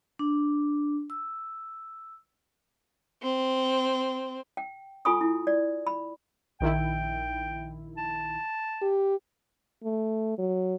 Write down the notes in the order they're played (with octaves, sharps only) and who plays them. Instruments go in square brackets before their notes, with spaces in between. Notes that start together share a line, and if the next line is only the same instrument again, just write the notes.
[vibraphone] D4
E6
[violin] C4
[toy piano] G5
F4 A4 G#5 B5 C#6 D#6
E4
D5
B5
[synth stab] A#1 D#3 E4 [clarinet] G5
[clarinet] A5
[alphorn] G4
[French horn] A3
F#3